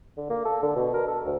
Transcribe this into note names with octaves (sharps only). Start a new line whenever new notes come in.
D3
A#3
A4
D3
B2
A#4
A4
D2